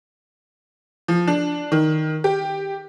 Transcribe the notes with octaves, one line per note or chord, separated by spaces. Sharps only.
F3
D4
D#3
G4